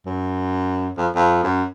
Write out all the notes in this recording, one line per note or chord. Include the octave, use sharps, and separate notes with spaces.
F#2
F2
F2
F#2